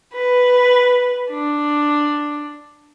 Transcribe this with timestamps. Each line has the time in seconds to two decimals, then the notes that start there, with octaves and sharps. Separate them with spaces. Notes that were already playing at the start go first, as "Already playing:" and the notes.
0.13 B4
1.30 D4